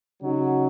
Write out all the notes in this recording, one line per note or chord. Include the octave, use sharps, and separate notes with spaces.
C#3 F#3 D#4 F#4